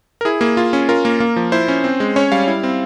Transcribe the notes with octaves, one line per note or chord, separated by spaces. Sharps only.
A#4
E4 G#4
A#3 G#4
F4
C#4
F4 A#4
A#3
A#3
F3
E4 C5
C#4
C4
G#3
C#4 C#5
G3 F5
E4
C4